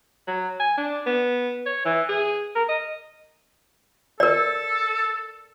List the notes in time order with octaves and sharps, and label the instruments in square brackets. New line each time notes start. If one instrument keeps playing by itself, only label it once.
[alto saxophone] F#3
G#5
D4
B3
C#5
E3
G#4
A#4
D#5
[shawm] A4 [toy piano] A#4 D5